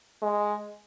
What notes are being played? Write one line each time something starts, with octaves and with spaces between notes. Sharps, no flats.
G#3